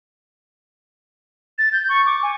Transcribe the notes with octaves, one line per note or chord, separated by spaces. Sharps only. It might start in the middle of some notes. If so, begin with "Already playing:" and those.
A6
G6
C#6
D6
G#5